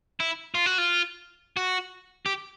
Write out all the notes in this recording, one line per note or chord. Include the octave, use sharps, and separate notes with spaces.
E4
F4
F#4
F4
F#4
G4